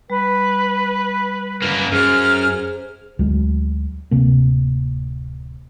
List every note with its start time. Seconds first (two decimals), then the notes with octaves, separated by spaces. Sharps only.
0.10 G3 B4
1.62 F#2 A#3
1.92 F#2 G#4 C5 F6
3.19 D2 F#3 G#3
4.11 D1 C3 A#3